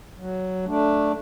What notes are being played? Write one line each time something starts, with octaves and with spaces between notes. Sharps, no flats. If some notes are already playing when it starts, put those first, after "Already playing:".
F#3
A3 D4